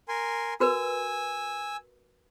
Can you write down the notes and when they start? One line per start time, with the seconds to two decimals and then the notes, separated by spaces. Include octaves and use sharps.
0.08 A#4 G#5 C6
0.60 F#4 A#4 B4 G#5 E6